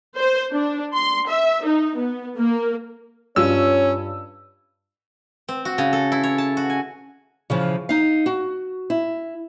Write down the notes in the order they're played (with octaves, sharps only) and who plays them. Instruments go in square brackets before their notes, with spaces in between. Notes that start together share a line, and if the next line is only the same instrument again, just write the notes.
[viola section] C5
D4
C6
E5
D#4
B3
A#3
[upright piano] G2 F4 [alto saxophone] C#4 [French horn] C#5 [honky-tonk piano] E6
[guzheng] C4
F#4
C#3
A4
E4
C#5
A5
F#4
G#5
[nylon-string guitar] C#3 E3 F3
D#4 F5
F#4
E4